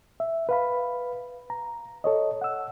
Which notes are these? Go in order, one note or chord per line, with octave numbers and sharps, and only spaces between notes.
E5
B4 F5 B5
A#5
A4 C#5 D#5
F#5 E6